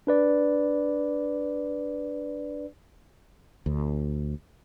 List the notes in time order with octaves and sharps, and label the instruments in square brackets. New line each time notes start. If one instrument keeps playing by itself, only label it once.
[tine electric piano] D4 B4 D5
[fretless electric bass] D2